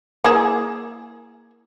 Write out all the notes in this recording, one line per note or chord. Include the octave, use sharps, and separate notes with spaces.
A#3 E4 G#4